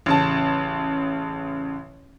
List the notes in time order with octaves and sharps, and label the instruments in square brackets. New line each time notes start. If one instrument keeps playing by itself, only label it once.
[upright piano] A1 C#3 A5